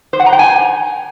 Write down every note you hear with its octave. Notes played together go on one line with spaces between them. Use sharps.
C5
F#5
A#5
G5
G#5